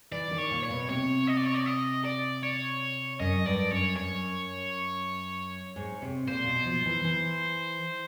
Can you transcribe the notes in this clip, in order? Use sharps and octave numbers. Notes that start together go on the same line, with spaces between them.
E3 D5
D#3
C#5
A#2
C#5
B2
C3 C#5
D#5
D5
C#5
D5
D#5
D5
C#5
F#2 D#5
G2 D5
F#2 C#5
F#2 C#5
G#2
C3
A#2 C5
B2
F3
E3
E3